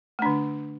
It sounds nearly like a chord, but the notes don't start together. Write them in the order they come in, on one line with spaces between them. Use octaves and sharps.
A3 D4 D3